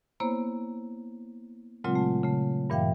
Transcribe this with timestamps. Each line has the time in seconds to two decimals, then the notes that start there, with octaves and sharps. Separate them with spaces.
0.20 A#3 B3 E4 C5 C#5
1.84 A#2 C#3 F#3 G#3 C4 F4
1.95 A3
2.24 C#3 A3
2.70 G2 A#2 E3 E5 F5 G5